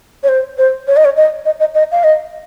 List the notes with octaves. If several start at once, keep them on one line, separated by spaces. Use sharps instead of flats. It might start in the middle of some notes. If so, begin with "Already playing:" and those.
C#5
C5
C5
C#5
D#5
C#5
D#5
D#5
D#5
D#5
F5
D#5